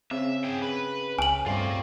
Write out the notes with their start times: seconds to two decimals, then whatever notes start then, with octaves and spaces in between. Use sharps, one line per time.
0.11 C#3 C4 E5
0.44 G#4 G5
0.62 B4
1.19 C#2 G#5 F#7
1.46 G2 G3 A3 C4 F4 D5